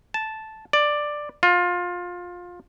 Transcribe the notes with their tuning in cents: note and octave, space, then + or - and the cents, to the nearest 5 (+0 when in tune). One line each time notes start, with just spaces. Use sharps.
A5 -5
D5 +10
F4 +20